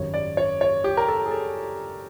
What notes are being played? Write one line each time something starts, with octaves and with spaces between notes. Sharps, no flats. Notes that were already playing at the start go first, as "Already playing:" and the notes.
Already playing: G#1 F#2 D#3 G3 C#5
D5
C#5
C#5
G4
A#4
A4
G#4
A4